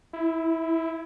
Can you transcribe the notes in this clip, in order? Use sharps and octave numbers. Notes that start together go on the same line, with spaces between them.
E4